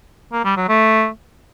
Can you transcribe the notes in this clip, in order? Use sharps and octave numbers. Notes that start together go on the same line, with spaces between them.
A#3
G3
F#3
A3